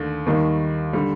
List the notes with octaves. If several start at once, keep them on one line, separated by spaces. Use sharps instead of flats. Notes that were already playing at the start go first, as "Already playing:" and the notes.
Already playing: D#2 D3 A3
D#2 D#3 G3
D3 G3